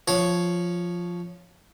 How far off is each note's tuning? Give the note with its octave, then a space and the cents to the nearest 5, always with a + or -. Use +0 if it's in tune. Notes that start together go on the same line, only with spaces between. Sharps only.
F3 +0 C#5 +0